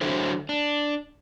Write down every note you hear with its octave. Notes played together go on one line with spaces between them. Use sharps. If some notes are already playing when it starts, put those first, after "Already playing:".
D3 F#3 D4 E4 A4 C5
D4